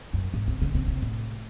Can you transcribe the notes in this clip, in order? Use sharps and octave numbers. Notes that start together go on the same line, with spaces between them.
F#2
G#2
C3
C#3
C3
C3
A2